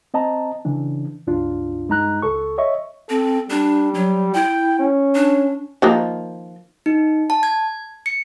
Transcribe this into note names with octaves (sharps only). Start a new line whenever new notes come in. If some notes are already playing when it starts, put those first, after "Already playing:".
C4 D#5 A5 A#5
C#3 E3 D4
C#2 G2 D4 F4
G2 G#3 D#4 A#5 F#6
C#2 A4 C#6
C#5 D#5 E5 C#6
C4 A4
G3 D4
F#3
E4 G5
C#4
D4
D#3 F3 A#3
D#4
A5
G#6
C#7